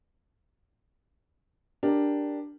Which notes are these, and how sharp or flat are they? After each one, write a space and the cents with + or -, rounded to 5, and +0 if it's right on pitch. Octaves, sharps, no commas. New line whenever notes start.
D4 +0 G4 +0 A#4 +0